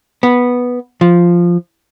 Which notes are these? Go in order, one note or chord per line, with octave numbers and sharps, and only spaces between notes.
B3
F3